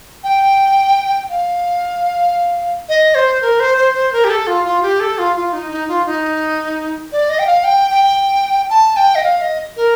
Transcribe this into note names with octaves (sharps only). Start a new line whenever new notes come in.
G5
F5
D#5
C5
A#4
C5
C5
C5
A#4
G4
A4
F4
F4
G4
A4
F4
F4
D#4
D#4
F4
D#4
D5
D#5
G5
F5
G5
G5
A5
G5
D#5
F5
D#5
A#4